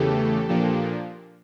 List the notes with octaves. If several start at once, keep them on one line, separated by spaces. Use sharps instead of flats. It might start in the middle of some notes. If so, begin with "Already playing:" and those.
Already playing: E2 C#3 E3 A3 G4 A4
A#2 F3 A#3 D4 G4 A4